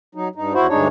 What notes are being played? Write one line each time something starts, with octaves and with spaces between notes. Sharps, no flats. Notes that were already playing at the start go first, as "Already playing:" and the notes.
F#3 D#4
G2 D#4
E2 E4 F#4 C5
D2 G2 G#3 D4 D#4 C#5